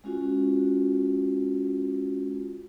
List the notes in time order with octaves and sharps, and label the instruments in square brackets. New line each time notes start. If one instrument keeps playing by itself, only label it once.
[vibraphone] G#3 C#4 F4 F#4